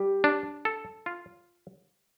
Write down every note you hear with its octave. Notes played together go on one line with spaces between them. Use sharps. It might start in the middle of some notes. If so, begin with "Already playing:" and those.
Already playing: G3 G4
D4
A4
F4